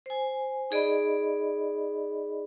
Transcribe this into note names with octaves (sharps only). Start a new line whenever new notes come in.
C5 G#5
D#4 G#4 D5 D#5 B5